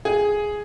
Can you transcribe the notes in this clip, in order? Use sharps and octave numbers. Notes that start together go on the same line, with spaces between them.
G#4